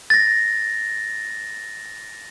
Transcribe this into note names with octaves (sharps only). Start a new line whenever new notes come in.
A6 A#6